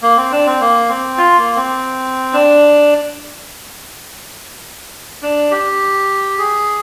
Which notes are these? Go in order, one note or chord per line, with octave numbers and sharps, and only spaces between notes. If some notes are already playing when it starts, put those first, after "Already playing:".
A#3
C4
D4
C4
A#3
C4
F4
A#3
C4
D4
D4
G4
G#4